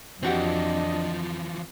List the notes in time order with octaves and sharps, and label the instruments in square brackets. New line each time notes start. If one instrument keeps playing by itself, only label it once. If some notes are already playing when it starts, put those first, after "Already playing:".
[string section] F2 [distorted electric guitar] E3 F3 [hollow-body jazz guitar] C4 F#4 G4 [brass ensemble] D4 D#5